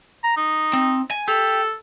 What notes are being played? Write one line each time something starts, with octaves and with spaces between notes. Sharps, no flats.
A#5
D#4
C4
G#5
G4 A4